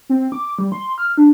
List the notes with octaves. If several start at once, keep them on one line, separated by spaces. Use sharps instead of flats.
C4
D6
G3
C6
F6
D4